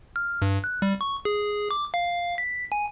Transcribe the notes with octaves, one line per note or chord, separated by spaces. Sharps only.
F6
G2
F#6
G3
C#6
G#4
D6
F5
B6
G#5